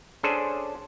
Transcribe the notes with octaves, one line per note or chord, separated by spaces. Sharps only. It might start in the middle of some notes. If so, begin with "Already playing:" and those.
C#4 D4 G#4 A4 C5